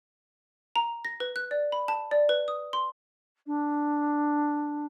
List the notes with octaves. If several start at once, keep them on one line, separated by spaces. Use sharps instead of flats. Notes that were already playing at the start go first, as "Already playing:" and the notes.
A#5
A#6
B4
F#6
D5
B5
A5
D5
B4
D#6
C6
D4